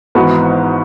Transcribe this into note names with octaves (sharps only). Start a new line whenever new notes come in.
G#1 G#2 E3 B3 F#4